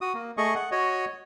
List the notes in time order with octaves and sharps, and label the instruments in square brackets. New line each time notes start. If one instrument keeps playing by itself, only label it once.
[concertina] F#4 D#6
A#3
A3 G#4 D#5 C#6
F#5
F#4 C#5 D#5